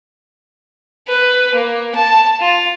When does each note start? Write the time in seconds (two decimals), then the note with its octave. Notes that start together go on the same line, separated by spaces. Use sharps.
1.08 B4
1.55 A#3
1.95 A5
2.40 F4